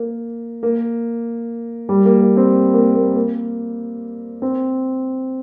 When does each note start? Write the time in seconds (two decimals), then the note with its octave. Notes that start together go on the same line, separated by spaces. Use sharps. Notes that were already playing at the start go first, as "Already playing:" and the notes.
Already playing: A#3
0.63 A#3
1.89 G3
2.05 A#3
2.21 A#3
2.37 C4
2.74 A#3
2.95 A#3
3.16 A#3
4.42 C4